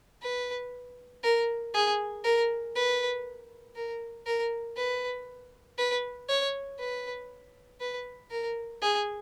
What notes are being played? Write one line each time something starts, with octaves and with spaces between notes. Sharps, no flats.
B4
A#4
G#4
A#4
B4
A#4
A#4
B4
B4
C#5
B4
B4
A#4
G#4